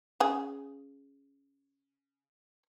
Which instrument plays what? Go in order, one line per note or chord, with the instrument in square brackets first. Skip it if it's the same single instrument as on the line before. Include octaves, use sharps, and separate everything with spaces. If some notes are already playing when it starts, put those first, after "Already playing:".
[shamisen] C#3 G#4